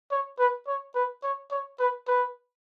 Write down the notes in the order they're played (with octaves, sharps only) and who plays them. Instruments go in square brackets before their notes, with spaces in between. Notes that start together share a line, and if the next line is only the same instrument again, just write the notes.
[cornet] C#5
B4
C#5
B4
C#5
C#5
B4
B4